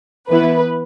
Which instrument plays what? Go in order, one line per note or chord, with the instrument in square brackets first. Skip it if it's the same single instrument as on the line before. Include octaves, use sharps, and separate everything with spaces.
[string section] E3 B3 E4 B4